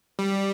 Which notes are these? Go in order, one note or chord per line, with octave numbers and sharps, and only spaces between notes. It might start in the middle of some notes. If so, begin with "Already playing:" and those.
G3